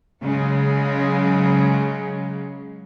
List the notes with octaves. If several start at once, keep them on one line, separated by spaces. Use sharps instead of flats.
C#3 F#3 G#3